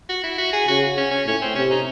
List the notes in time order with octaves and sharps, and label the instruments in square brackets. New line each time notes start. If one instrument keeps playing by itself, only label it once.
[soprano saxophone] F#4
E4
F#4
G#4
[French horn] C#3 [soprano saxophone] F#4
[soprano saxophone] C#4
C#4
[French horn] A2 [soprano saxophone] C#4
[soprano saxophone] C4
[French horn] C3 [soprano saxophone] C#4
[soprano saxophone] D#4